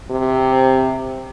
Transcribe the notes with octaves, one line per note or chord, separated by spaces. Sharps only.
C3